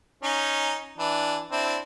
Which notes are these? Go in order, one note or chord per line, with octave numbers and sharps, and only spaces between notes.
C#4 D#4
E3 D4
C4 D4 E4